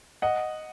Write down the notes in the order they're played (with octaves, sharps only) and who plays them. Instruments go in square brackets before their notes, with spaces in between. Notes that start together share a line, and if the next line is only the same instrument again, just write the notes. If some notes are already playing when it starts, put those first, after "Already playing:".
[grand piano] D#5 F#5